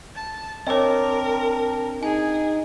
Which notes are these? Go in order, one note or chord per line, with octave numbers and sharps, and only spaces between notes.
A5
C4 D4 A#4 C#5 D#5
D#4 G#4 G#5